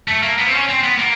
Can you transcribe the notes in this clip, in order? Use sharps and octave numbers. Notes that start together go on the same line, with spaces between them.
A3
A#3
B3
C4
C#4
C4
B3
A#3